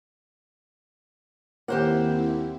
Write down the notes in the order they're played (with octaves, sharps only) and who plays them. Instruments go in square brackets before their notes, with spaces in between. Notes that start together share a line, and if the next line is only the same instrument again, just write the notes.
[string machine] D#2 C4 E4 [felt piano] A#3 [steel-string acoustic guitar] G4 C5 F#5